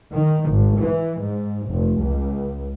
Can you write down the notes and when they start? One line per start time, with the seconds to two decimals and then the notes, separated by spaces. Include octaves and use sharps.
0.12 D#3
0.50 G#1
0.80 E3
1.21 G#2
1.68 F1
2.01 C#2